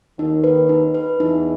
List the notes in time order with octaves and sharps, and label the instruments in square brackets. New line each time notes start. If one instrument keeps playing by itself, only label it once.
[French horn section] D#2 D#3 [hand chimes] D#4
[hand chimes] B4
D#4
B4
[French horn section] E2 E3 [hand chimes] D#4